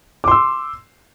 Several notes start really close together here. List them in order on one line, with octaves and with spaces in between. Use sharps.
D6 C6 E6